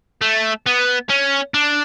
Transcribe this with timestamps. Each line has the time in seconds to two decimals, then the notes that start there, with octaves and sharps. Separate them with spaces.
0.22 A3
0.66 B3
1.10 C#4
1.54 D4